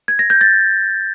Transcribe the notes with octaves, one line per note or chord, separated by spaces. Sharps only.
G#6
A#6
G6
A6